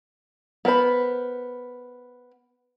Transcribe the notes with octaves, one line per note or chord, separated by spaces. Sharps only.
B3 A#4 C5 B5